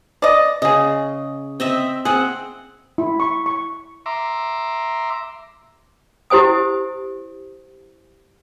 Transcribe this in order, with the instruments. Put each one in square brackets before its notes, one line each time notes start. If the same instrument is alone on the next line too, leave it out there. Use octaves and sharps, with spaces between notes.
[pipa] D5 D#5
[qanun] C#3 [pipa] G#4 D#5
[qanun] C4 D#5 E5
[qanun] C4 F#5 [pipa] G#4
[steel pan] E4
C#6
C#6
[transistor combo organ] E5 A#5 C6 D6
[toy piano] E4 G4 C5 G#5 D#6